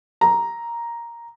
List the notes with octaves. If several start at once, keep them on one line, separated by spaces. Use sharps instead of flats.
A#5